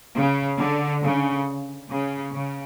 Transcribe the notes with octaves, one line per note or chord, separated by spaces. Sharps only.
C#3
D3
C#3
C#3
C#3